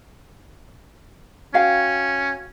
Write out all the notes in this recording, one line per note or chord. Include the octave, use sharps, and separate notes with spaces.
C#4 F#4 F5 G5